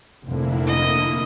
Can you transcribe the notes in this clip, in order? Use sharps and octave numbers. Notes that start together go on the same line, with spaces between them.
F1 F2 A#2 D3 A#3 E4
D#5